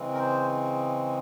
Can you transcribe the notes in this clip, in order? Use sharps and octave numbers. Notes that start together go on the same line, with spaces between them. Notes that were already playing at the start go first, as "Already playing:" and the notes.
Already playing: C#3 E3 G#3 C4
A#4
C5